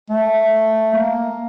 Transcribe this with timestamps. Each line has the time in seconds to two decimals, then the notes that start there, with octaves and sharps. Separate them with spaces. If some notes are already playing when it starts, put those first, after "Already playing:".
0.10 A3
0.93 A#3